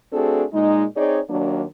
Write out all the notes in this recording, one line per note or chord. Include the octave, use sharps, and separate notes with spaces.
A3 C4 D4 F#4 G#4 A4
A#2 G#3 D#4
C4 D#4 G#4 C#5 D5
D#2 D#3 F#3 A#3 D4